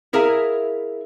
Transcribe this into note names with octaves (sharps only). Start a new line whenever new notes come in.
E4 G#4 A#4 E5 F5